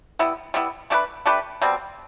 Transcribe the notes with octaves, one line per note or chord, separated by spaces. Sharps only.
G3 B3 E4
G3 B3 E4
A3 D4 G4 B4
A3 D4 G4 B4
B2 G3 C4